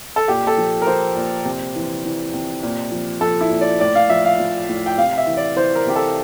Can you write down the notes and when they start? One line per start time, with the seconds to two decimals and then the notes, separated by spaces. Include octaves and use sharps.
0.16 A4
0.28 A#2 G4
0.47 A4
0.58 F3
0.82 A#4
0.87 F3 C5
1.16 A#2
1.45 C3
1.75 E3
2.05 E3
2.33 C3
2.63 A#2
2.92 F3
3.21 F3 A4
3.41 E4
3.50 A#2
3.61 D5
3.80 A2 D5
3.95 F5
4.10 F3 E5
4.25 F5
4.39 F3
4.69 A2
4.86 G5
4.97 C3 F5
5.18 E5
5.27 E3
5.37 D5
5.56 E3 C5
5.75 A#4
5.86 C3 G4
5.96 A4